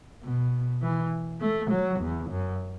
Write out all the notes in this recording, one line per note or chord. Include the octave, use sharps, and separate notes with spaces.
B2
E3
A3
F#3
E2
F#2